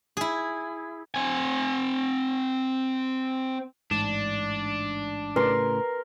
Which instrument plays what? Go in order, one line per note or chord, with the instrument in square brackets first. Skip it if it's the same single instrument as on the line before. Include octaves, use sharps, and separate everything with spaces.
[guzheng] E4 G#4
[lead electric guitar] C4 G#5
[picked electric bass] A1 G#2 [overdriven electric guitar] D4 [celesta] E7
[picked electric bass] A2 C#3 [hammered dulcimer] A#4 C6 [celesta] B4